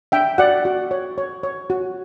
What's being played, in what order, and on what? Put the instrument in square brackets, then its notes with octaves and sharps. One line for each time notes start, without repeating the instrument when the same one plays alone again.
[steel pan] D4 E5 G5
F#4 D5 F#5
F#4
C#5
C#5
C#5
F#4